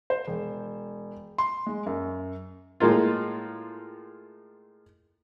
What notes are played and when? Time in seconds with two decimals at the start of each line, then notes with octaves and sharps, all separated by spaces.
0.10 C5
0.27 E1
1.38 C6
1.67 G#3
1.86 F#2
2.80 A2 G#3 A#3 F4